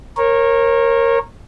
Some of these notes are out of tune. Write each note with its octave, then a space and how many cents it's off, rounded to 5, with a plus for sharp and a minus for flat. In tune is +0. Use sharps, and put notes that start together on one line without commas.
A#4 +0 C#5 -30